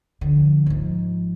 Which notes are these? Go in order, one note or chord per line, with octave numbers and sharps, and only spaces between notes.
D3 F3
G#2 F3